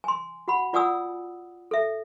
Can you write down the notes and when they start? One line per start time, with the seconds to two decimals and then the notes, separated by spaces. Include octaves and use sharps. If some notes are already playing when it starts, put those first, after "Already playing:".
0.04 G#5 C6
0.48 F#4 F#5 B5
0.73 F4 D5 F#5 G#5 D#6 E6
1.71 A4 E5